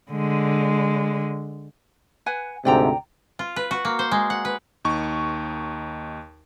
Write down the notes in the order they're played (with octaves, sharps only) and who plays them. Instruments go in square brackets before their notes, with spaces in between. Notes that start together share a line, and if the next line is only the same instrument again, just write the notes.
[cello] D3 G#3
[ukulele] B4 F#5 G#5
[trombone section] D2 G#2 C3 [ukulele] D5 G5 A#5
[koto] F4
B4
F#4
A#3
C5
G#3
F#5
B4
[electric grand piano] D#2 D#4 C#6